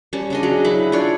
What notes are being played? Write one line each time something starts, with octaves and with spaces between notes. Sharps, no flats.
G3 C#4 A5
C#3 D4 D#5
F#3 G#4
E4 B4
D4 F4 C#5 D5